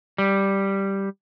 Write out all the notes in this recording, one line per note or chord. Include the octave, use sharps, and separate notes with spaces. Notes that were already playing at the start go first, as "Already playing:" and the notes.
G3